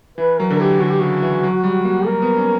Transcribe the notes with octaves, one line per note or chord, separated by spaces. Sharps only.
E3 B4
F#3 A#4
D3
A#4
E3 G4
D3 F#4
G4
C#3 F#4
E3
F#3
G3
A#3
A#3 A#4
B3
C#4